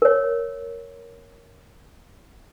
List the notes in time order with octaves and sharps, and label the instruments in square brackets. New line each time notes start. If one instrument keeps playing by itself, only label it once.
[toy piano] A#4 C#5